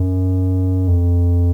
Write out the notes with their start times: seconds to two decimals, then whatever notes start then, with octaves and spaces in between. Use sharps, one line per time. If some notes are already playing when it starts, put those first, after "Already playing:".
Already playing: F#2
0.88 F2